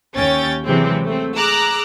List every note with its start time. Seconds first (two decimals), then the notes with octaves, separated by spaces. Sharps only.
0.15 D#2 C#4 C#5 G5 A6
0.64 C3 E3 F#3 G#3 C4
1.06 A3 C4
1.36 G#4 A#5 D6 E6 F#6